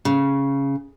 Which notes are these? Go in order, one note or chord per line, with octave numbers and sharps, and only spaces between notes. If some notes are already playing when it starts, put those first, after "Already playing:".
C#3